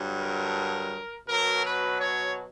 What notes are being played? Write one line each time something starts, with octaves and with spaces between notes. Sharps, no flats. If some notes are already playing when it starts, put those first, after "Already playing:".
Already playing: G2 D3 F#3
A#4
B2 F#3 A#4
B4
C#5